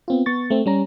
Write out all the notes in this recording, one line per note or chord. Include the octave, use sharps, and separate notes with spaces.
B3 C4 F4
B3 C#6 A6
A3 C4
G3 C#4 A#5